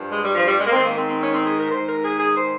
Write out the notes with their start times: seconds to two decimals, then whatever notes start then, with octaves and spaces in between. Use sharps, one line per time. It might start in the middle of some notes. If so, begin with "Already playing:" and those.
Already playing: G2 F3
0.11 G#3
0.23 G3
0.35 F3
0.47 G3
0.59 G#3
0.67 A#3
0.72 G#2 D#3 C4
0.84 A#3
0.96 C4
1.08 C4
1.21 C#4
1.33 C4
1.45 G#4
1.58 A#4
1.70 G#2 D#3 C5
1.86 A#4
2.03 G#4
2.19 G#4
2.35 C5